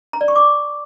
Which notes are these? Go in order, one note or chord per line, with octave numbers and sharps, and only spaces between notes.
A#5
D5
C#6
D6